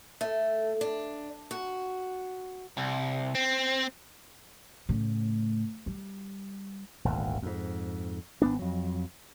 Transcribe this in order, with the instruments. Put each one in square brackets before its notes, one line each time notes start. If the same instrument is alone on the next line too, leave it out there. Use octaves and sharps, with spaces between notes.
[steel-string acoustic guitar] A3
D4
F#4
[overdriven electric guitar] C2
C4
[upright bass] A2 C#3
G3
[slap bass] D#1 G#1 D2
F2 G#2
G#1 B3 D4
F2 F#3